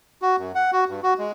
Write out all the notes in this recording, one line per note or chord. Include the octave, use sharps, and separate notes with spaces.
F#4
F#2
F#5
F#4
G2
F#4
G#3